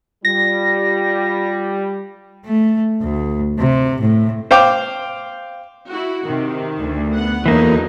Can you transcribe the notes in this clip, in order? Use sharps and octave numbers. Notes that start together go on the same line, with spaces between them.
G3 F4 A#6
A3
D2
C3
A2
C5 F5 G5 D6
E4 F#4
C3 D#3
D2
B3 F#5
E2 D3 E3 F#3 A#3 D#4